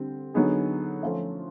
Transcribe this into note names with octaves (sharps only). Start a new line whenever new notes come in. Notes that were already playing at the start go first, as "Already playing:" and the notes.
Already playing: D3 G3 C4
D3 F#3 B3 D#4 G#4
F3 A3 C#4 F4